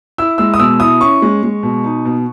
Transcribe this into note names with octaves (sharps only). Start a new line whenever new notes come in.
E4 E6
G#3 E6
D#6
B2 E6
E4 D#6
C#4 C#6
G#3
G#3
B2
D#4
B2